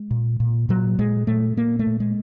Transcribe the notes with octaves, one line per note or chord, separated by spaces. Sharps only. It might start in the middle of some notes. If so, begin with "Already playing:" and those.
Already playing: G#3
A#2
A#2
A#2 F#3
A#2 G#3
A#2 A3
A#2 A#3
A3
A#2
G#3